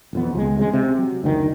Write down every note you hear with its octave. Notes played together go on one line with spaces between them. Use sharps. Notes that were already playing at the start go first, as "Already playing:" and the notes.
E1 F2 B3
C#2 F3 G#3
C3 F3 G#3
C3
F#3
F#1 D2 A2 D#3